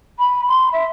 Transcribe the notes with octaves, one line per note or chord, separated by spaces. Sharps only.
B5
C6
E5